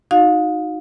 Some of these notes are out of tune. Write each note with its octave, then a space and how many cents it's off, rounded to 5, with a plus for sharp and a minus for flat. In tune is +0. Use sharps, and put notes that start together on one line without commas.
D#4 +0 F#4 -20 F5 +30